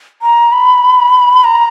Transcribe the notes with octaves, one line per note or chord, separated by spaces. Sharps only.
A#5
B5
A#5